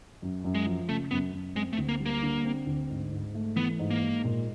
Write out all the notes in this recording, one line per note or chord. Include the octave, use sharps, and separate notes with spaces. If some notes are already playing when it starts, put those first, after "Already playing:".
F#2
F#2
G#3
F3
C#3 A3
F#2 B3
F#2
G#3 C4
A3
D2
A#3
G3
A#3
D3
C4
D2
G#2
G#2
A3
E3 B3
G#2
A#3
G#2
A#2